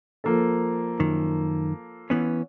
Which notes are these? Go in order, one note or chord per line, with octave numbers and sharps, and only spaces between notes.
F3 A#3 A4
F#2 D#3
E3 B3 C#4